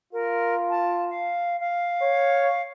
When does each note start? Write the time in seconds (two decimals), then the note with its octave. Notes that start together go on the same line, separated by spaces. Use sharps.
0.13 F4 A#4
0.70 A5
1.10 F5
1.60 F5
2.02 C#5